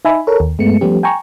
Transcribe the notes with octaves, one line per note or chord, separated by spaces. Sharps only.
D#4 E5 G#5 B5
A4 A#4 C#5
D#2
G2 G#3 A3 B3 C#7
F3 G3 A3 B3 C#4 G4
G5 G#5 A#5 C#6